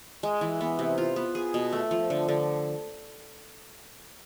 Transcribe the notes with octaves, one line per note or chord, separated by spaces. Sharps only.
G#3
E3
B3
C3
F4
B3
G#4
B2
A3
F3
D3
D3